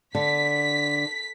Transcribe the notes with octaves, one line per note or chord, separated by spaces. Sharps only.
D3 B6